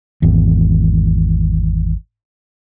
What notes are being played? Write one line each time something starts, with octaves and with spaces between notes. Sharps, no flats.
G#1 E2